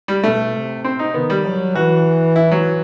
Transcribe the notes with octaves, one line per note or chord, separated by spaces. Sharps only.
G3
B2 A3
C3
C4
D#4
D#3 B3
G3
F#3
E3 F#4
E4
F#3